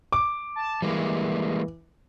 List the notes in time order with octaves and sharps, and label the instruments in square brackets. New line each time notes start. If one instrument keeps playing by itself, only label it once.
[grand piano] D6
[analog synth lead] A5
[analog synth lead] E3 [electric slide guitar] G3 G#3 A#3